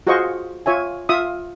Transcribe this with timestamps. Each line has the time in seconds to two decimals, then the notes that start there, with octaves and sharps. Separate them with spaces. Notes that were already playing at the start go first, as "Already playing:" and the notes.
0.07 F4 F#4 G#4 C5 D#5 C#6
0.66 F4 C#5 E5 G#5
1.09 F4 E5 D#6